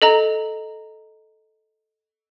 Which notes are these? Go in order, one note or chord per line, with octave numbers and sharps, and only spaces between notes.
A4 D#5 A#5